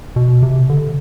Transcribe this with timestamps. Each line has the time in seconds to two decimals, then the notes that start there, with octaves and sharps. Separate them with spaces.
0.16 B2
0.43 C3
0.70 D3